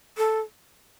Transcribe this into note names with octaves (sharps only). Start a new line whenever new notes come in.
A4